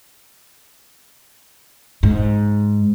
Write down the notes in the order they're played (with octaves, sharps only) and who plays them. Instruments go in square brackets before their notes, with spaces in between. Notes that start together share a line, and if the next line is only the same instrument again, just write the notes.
[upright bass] G#2